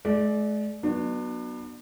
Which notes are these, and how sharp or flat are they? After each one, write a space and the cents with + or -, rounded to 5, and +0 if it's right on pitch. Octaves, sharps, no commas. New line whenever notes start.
G#3 +45 D5 +0
F#3 +0 B3 -20 D4 +35